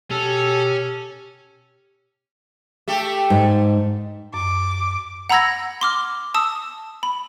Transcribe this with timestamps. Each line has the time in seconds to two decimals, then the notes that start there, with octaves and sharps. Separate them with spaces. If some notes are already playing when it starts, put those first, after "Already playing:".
0.11 B2 C#4 G4 A4
2.88 A3 G4 A4
3.30 G#2
4.34 F#2 D6
5.30 F#5 A#5 B5 E6 G#6 A#6
5.81 C6 D6 F6
6.34 A5 D#6 E6
7.03 B5